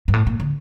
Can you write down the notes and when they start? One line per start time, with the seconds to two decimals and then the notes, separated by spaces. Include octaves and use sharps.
0.08 G2
0.13 A2
0.27 A#2
0.40 D3